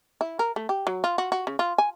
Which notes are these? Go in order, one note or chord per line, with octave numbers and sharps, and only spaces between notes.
E4
A#4
A3
G4
F#3
F4
F#4
F#4
C#3
F4
G#5